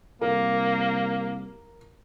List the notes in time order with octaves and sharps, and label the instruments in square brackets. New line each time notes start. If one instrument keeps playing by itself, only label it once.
[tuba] C2 [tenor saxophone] A#3 [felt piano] A#4